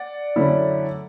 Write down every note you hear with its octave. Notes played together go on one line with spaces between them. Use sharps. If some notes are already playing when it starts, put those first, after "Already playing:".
Already playing: D5 F#5
F#2 D3 A3 C#4 E4